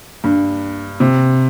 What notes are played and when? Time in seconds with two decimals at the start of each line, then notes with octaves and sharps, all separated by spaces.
0.24 G2
1.00 C3